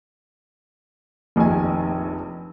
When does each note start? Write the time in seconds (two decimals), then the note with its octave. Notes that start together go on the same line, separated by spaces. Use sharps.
1.36 F1 A#1 D#3 D#4 G#5